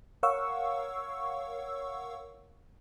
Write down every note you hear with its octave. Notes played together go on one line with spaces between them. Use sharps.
A#4 C#5 F5 F#5 C#6 E6